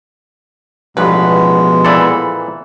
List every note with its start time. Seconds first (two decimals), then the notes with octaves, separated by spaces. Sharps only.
0.97 A1 G2 B2 F3 G#3 B3 B4
1.85 A#2 E3 C4 A4 D5 B5